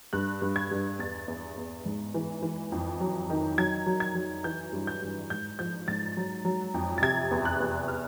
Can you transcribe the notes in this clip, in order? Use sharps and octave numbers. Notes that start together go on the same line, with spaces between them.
G2 F#6
G2
G#6
G2
E2 A6
E2
E2
G#2
E3
E3
F2
F#3
D#3
F#3 G#6
F#3
G#6
F#3
E3 G6
G2
G6
G2
G#2 G6
F3 G6
G#2 A6
F#3
F#3
F2
A6
C3 G#6
E2
F#6
E2
F6